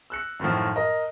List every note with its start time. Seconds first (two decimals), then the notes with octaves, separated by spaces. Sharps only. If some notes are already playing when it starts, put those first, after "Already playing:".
0.10 E6 F#6 C#7
0.40 F#2 A2 D#3 F3
0.76 A#4 D#5